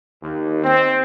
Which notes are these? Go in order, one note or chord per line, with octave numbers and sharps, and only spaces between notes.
D#2
C4